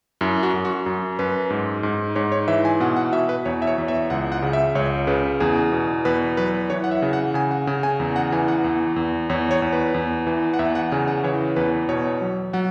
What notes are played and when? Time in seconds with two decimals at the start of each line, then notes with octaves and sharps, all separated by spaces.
0.21 F#2 E4
0.43 F#4
0.54 F#2
0.65 F#4
0.86 F#2
1.19 F#2 B4
1.50 G#2
1.83 G#2
2.15 G#2 C#5
2.32 C#5
2.48 E3 E5
2.65 G#5
2.80 B2 F#5
2.96 F#5
3.12 B2 E5
3.29 B4
3.46 E2 C#5
3.62 E5
3.67 C#5
3.78 E2
3.88 E5
4.10 C#2 F#5
4.32 F#5
4.42 C#3
4.53 E5
4.75 C#2 C#5
5.07 C#3 B4
5.40 E2 G#4
5.72 B2
6.05 E2 B4
6.37 F#3 B4
6.70 E3 C#5
6.84 F#5
6.91 E5
7.02 C#3
7.13 F#5
7.34 C#3 G#5
7.51 F#5
7.67 C#3 G#5
7.83 G#5
8.00 E2
8.16 F#5
8.32 E3 G#5
8.48 F#5
8.64 E2
8.96 E2
9.30 E2 C#5
9.51 C#5
9.62 E2
9.73 B4
9.94 E2
10.27 E3
10.54 F#5
10.59 E2 E5
10.75 F#5
10.92 C#3 G#5
11.08 F#5
11.24 E3 C#5
11.56 E2 B4
11.89 B2 C#5
12.22 F#3
12.53 F#3 F#5